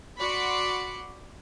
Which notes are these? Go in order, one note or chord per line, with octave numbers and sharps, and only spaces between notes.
F#4 D5 B5 C6 C#7